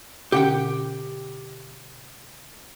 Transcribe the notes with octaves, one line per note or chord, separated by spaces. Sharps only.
B2 D3 C#4 G4 F#5 G5